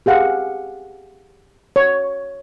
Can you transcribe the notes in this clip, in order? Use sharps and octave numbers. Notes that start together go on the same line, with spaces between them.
G4 G#4 F5 F#5
C#5